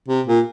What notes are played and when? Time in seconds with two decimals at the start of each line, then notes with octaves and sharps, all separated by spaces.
0.09 C3
0.27 A#2